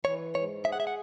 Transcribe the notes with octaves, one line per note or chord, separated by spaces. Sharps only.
E3 C#5
G#2 C#5
G#4 E5
F#5
E5
F#5